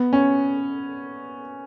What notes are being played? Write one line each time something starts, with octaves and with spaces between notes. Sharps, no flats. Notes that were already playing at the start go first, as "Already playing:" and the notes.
Already playing: B3
C#4